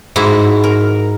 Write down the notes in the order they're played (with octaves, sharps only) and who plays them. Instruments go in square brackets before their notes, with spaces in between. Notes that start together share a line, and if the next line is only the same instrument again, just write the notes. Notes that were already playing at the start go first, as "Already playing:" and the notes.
[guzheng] G#2 E4 F#4
A#4